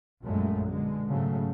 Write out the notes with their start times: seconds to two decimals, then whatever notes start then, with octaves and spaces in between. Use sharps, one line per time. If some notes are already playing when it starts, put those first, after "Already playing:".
0.24 A#1 F#2 G#3 A3
0.68 B2 D3 G#3
1.07 G#2 C#3 F#3 A3